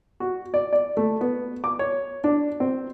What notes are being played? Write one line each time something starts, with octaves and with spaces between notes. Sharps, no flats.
F#4
D5
D5
A3
B3
D6
C#5
D4
C4